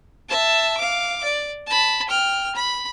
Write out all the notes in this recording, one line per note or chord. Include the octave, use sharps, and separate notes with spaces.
E5 A5
F5 D6
D5
A5 B5
G5 F6
B5